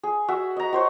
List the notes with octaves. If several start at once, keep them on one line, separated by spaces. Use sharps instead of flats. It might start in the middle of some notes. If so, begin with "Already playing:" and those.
G#4
F#4 E5
D#5 A#5
F#4 C5 C#5